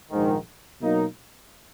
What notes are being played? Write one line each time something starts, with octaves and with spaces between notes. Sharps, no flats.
A#1 G#2 D#3
B2 F#3 A#3 D#4